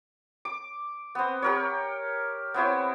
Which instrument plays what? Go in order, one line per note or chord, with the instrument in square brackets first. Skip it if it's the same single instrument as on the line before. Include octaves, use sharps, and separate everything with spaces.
[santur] D6
B3 C4
G4 A#4 C#5
B3 C4 E4 C#5